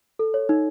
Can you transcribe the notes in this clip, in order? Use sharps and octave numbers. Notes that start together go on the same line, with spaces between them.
A4
C#5
D#4